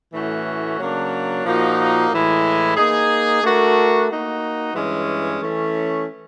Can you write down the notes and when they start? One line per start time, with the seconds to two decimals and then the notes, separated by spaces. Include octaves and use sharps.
0.14 A2 E3 A3 C#4 F#4
0.79 C#3 F#3 A#3 D4
1.45 A#2 F3 A#3 D#4 F#4
2.11 A2 E3 G#3
2.77 A#3 D#4 G#4
3.42 A3 D4 F#4 A#4
4.09 A#3 D#4 F#4
4.74 G2 E3 G#3 C#4
5.41 E3 A3 C#4